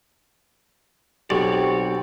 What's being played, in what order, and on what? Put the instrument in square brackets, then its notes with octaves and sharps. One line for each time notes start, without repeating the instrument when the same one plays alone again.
[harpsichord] B1 [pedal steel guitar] C4 C#5 D5 [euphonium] G4